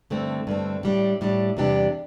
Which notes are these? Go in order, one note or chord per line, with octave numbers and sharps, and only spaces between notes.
G2 D3 A3 C4
G2 D3 A3 C4
A2 G3 D4
A2 G3 D4
E2 C3 G3 D4 G4